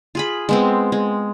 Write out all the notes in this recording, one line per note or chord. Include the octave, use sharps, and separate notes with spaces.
F4 G#4 B5
G#3 B3 C4
G#3